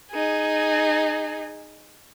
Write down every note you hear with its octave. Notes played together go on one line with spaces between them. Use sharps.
D#4 G#4